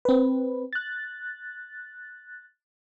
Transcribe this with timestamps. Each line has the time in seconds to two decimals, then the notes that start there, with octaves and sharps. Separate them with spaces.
0.05 C4 B4
0.73 F#6 A6